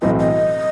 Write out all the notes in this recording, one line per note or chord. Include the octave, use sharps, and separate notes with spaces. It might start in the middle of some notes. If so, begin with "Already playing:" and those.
B1 A2 E3 A3 C4 D#5
D#5